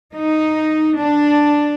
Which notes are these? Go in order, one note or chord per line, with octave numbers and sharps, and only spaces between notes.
D#4
D4